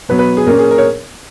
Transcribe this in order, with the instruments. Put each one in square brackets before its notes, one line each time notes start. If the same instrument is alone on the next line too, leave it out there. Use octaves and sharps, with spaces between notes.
[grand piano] B2 F#3 B3 B4
B4
G#4
A#2 A#3 C#4 A#4
G#4
A#4
C#5